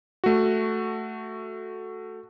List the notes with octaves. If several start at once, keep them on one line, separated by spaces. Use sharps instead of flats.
A3 F#4